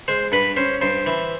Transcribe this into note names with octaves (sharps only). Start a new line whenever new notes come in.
G#3 C5
G2 B4
C#4 C5
G2 C5
E3